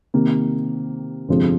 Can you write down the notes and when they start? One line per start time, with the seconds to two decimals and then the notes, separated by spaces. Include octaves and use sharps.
0.14 C3 D#3 A#3
1.28 G1 F2 C3 F3 G#3